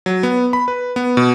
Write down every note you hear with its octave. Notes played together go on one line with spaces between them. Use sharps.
F#3
B3
B5
B4
B3
B2